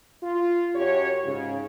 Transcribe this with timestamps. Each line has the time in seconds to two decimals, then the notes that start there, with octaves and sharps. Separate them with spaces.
0.23 F4
0.75 F#2 G4 C#5
1.25 G#2 C#3